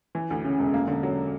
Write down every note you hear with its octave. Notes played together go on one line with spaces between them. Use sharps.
E3
D2
C#3
E1
A#3
D3
F#3